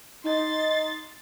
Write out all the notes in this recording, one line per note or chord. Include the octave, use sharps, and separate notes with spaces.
D#4 C6 A6